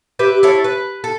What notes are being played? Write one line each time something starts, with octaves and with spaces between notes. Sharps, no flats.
G4 B4 E5
E4 A4 C#5
B4
A4